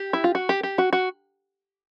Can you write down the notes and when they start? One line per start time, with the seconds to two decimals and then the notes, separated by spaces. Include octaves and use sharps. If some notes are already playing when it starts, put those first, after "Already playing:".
Already playing: G4
0.13 E4
0.24 F4
0.35 F#4
0.49 G4
0.63 G4
0.78 F#4
0.93 F#4